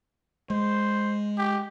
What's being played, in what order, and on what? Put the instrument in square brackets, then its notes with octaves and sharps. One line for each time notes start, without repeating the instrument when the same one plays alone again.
[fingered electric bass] G#3 [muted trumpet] C5
[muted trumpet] G4